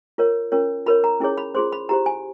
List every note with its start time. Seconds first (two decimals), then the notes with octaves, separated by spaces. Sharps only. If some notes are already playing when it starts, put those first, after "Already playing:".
0.18 F4 A#4 C#5
0.52 C#4 F4 A#4 C#5
0.86 F4 A#4 C#5 B5
1.04 A#5
1.20 C#4 E4 G#4 C#5
1.37 B5
1.55 F4 G#4 C5 C6
1.72 B5
1.89 E4 G4 C5 A#5
2.06 G#5